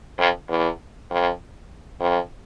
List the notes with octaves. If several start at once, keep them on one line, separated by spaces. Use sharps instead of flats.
F2
E2
F2
F2